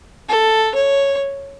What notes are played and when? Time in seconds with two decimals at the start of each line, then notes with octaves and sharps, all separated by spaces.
0.29 A4
0.75 C#5